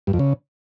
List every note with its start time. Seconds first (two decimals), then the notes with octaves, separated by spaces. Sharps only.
0.07 G2
0.13 F2
0.19 C#3